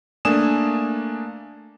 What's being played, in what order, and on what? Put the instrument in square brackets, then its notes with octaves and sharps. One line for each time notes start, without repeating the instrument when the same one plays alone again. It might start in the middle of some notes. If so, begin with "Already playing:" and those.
[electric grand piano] A3 A#3 D4 G#5 D#6 E7